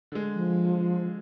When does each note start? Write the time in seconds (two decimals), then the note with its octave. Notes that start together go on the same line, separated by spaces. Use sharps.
0.12 D3 G#3
0.34 F3